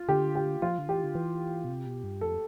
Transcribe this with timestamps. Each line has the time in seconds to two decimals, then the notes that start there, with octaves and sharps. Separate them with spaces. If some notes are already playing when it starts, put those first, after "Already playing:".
Already playing: F4
0.09 D3 G4
0.35 G4
0.62 F3 F4
0.78 D3
0.89 E3 G4
1.04 D3
1.15 E3
1.65 B2
1.69 C3
1.86 B2
2.04 G2
2.21 F2 A4